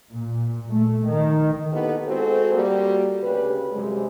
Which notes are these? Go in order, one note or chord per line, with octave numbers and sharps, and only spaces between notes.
A#2
A3
D#3
A#3 B3 D#4 E4 G4 A4
G#3 C4 F#4 A4
G3 A#3 F#4
D2 C#3 G4 B4
F#2 C3 G3 G#3